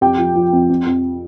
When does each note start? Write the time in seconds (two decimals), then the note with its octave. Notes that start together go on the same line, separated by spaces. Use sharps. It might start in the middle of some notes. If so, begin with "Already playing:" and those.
0.01 F2 G4 G5
0.18 F3
0.35 F3
0.53 F2
0.69 F2
0.86 F2